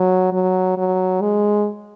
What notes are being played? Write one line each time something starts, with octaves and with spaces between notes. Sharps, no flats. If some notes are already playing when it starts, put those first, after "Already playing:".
Already playing: F#3
F#3
F#3
G#3